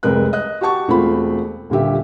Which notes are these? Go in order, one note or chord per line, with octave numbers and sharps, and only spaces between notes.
F1 C2 G#3 A#4 B4 F#6
D#5 F#6
F#4 G4 F#5 A5 C#6
E1 A3 C4 F4 B5
D#1 A#2 D3 G4 E5